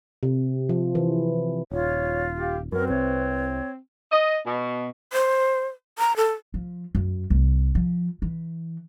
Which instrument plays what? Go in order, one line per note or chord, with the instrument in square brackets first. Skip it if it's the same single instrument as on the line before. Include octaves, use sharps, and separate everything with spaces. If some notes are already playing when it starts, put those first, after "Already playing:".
[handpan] C3
F3
E3
[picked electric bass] D#1 [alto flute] F4 [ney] C#5
[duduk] G4 [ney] F5
[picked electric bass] F#2 F#3 [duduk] C4 [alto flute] A#4 [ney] B4
[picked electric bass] C2 C3 [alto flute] C#5
[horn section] D#5
B2
[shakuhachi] C5
A#5
A4
[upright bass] F3
F#2
C2
F3
E3